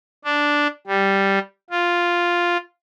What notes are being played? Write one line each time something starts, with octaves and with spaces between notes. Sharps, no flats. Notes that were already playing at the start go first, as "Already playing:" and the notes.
D4
G3
F4